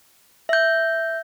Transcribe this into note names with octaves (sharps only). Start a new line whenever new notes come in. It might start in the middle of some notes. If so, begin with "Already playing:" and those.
E5 G6